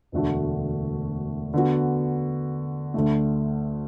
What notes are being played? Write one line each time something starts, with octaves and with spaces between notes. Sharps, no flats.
E1 D2 D3 A3 F#4
D3 B3 F#4
D2 D3 A3